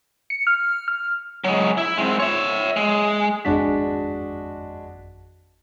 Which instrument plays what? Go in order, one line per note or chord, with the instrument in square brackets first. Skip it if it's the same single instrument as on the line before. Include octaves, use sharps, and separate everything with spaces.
[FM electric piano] C#7
F6
F6
[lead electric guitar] F#3 G#3
E4
G#3 C4
C#5 E5
G#3
[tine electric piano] G#1 F2 B6 [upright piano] G#3 D4 F#4